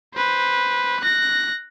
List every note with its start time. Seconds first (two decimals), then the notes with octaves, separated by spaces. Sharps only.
0.14 B4 C5
1.00 F#6 A#6